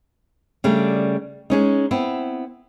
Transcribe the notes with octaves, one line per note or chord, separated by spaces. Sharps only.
C#3 G3 A3 D4
G#3 C#4 D#4
B3 C4 E4